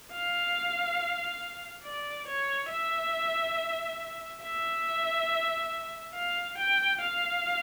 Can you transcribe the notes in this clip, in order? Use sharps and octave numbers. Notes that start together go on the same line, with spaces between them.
F5
D5
C#5
E5
E5
F5
G5
F5